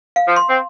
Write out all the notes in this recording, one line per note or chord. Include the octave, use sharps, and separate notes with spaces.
F5
F3
C6
C4